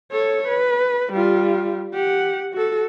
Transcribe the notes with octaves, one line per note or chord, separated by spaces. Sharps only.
A4 C#5
B4
G3 F4
G4 F#5
F#4 A4